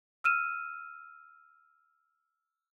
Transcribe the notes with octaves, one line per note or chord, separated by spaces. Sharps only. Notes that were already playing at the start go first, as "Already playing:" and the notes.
E6 F6 D#7 E7